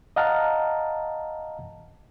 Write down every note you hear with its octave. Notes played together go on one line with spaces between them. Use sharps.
D#5 F5 F#5 A5 A#5 F6